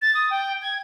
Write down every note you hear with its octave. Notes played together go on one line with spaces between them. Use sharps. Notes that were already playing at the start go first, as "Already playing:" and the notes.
A6
D#6
G5
G#6